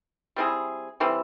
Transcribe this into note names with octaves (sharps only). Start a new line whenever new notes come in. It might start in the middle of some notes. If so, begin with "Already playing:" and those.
G3 C4 E4 G#4
E3 G3 C4